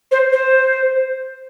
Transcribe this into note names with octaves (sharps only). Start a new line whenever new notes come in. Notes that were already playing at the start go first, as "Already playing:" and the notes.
C5
C5